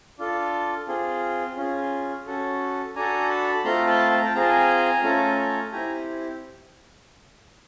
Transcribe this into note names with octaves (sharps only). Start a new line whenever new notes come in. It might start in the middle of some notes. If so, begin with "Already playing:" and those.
D4 F4 A4
C4 F4 G#4
C#4 F4 G#4
C#4 F#4 A4
D4 F#4 A4 G#5 A#5
A5 B5
A3 C4 F4 A#5 C6
A5 B5
A5
A#5
G5 A5
C4 F4 G#4 A#5
A5
G#5 A#5
A3 C#4 F4 A4
C4 E4 G4 G#5 A#5